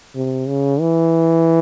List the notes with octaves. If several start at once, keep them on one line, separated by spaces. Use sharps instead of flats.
C3
C#3
E3